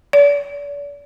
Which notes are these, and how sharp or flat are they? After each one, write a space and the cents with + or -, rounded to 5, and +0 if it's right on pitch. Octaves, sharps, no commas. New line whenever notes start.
D5 -40